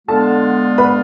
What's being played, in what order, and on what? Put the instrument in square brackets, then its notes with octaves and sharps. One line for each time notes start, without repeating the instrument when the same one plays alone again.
[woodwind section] D3 G#3 B3 F4 [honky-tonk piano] A4 A5
[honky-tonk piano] B4 B5